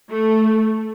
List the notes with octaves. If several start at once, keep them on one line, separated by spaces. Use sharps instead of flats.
A3